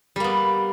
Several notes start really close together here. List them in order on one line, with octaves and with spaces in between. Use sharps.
G3 A#3 B3